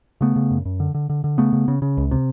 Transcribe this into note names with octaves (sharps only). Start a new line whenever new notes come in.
C#3 A3 B3
C#3
F#2
F#2
D3
D3
D3
D3
C#3 A3 B3
C#3
C#3
C#3
C#2
C3